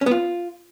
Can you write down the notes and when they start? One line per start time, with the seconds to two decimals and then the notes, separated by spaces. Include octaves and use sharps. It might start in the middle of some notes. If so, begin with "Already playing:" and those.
0.01 C#4
0.06 B3
0.11 F4